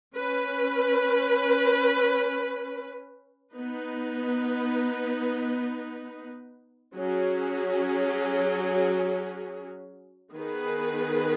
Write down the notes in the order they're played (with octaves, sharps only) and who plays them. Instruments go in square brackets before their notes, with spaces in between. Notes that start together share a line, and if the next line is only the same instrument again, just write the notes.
[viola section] C#4 B4
B3 D#4 B4
F#3 C#4 G#4
D#3 B3 G#4 B4